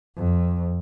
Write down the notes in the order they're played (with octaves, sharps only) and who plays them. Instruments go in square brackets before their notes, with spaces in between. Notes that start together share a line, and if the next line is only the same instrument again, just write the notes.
[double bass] F2